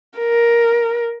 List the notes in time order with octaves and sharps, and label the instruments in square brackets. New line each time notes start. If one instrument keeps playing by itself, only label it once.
[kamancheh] A#4